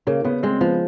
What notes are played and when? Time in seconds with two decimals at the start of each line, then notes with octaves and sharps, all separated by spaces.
0.07 C#3 A#3
0.24 C#3 B3
0.43 G#3 C4
0.61 F3 B3